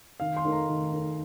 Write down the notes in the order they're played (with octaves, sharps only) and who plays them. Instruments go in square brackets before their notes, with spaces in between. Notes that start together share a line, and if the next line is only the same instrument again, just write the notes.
[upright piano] D#3 [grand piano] F5
[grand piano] C6
[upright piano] A3 D#4 A#4
[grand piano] A#5
[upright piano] D#3
A3 D#4 A#4